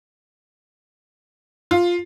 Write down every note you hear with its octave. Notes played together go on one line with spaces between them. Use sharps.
F4